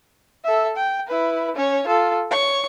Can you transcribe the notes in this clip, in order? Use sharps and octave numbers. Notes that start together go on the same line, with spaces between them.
A4 E5
G5
E4 B4
C#4 C#5
F4 A4
C#5 C#6